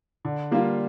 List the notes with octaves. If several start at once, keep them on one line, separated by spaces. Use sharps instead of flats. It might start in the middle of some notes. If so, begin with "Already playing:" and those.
D3
G3 A#3 F4